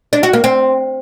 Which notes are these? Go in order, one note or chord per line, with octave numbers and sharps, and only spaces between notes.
D4
F#4
A#3
C4